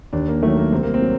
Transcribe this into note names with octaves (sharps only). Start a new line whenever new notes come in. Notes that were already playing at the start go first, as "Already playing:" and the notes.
D#2 D4
A#3
D#3 F#3 A3
A#3
C2 C4
A#3
C4
F#3